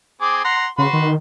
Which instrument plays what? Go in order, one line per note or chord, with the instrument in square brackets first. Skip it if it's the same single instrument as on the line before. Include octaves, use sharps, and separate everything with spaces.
[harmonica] C4 G#4 D6
F#5 A#5 C6
[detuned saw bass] C#3 [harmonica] F#4 B4 C6
[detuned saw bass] D#3